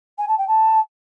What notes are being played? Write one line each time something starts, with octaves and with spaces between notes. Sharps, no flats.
G#5
A5
G5
A5